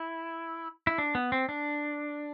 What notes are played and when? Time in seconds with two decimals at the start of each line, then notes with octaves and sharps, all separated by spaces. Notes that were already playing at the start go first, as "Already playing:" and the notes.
Already playing: E4
0.87 E4
0.98 D4
1.15 B3
1.32 C4
1.49 D4